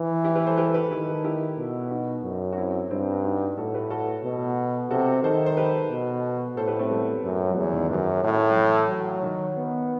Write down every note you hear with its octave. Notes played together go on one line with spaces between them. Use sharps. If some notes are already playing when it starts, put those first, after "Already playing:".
Already playing: E3
E4 G4
G4 B4
A4 C5
G4 B4
A4
G4 B4
D#3 E4 G4
E4 G4
B2
D#4 F#4
F#2
F#4
C4 E4
G2 C4 E4
D#4 F#4
A2 F#4 A4
G4 B4
F#4 A4
B2
C3 F#4 A4
D#3 A4 C5
C5
G4 B4
B2
A2 A4 C5
G4 B4
A3 C4
G3 B3
F#2
F#3
E2 E3 G3
D#3 F#3
F#2 E3 G3
A2
F#3
E3
F#3
D#3
B3